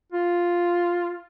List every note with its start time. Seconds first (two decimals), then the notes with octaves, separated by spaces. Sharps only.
0.12 F4